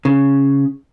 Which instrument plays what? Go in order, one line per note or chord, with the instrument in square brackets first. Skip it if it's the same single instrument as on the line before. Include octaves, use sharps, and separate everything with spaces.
[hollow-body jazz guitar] C#3